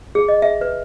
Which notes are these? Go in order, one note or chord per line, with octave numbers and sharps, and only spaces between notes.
G#4
D#5
E5
B4